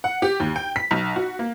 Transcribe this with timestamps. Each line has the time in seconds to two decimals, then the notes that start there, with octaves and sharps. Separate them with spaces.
0.04 F#5
0.22 G4
0.40 D#2
0.56 G5
0.76 B6
0.91 B1
1.16 F#4
1.39 A#3